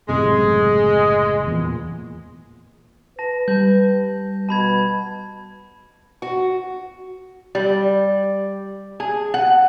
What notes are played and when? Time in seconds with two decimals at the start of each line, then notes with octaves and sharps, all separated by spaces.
0.09 F#1 A2 C3 G#3
1.47 E2 A#2
3.19 B4 A5 A#6
3.48 G3 A5 G6
4.49 B2 A5 B5 G#6
6.22 F#4
7.55 G3
9.00 G#4
9.34 F#5